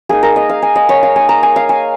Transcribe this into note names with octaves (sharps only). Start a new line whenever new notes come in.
A#3 D#4 G#4
A#4
D#5
F5
G#5
D#5
C#5
F5
A#3 D#4 G#5
A#5
G#5
F5
G#5